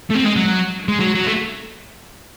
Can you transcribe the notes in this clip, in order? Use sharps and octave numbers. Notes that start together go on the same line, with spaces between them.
A3
C4
G#3
F#3
G#3
F#3
F#3
A3